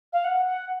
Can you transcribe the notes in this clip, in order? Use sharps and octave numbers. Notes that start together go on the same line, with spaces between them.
F5
F#5
F#5